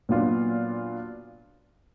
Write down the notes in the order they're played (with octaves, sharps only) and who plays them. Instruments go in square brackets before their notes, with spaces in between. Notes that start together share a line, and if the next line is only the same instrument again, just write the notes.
[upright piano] A#2 F#3 B3 D4 F4